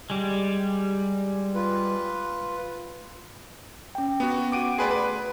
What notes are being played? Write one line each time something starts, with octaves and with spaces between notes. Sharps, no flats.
G3 G#3
F4 B4
C#4 G5
B3 F#4
F#4 F#5 G5 D6 D7 D#7
A3 G#4 B4 D5 C6
B4 B5